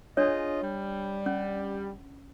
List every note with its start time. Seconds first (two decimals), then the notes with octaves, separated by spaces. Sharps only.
0.17 D4 F4 G#4 C#5 D#5
0.62 G3
1.26 C#4